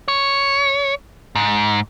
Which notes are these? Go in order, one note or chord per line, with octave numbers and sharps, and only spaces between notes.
C#5
G#2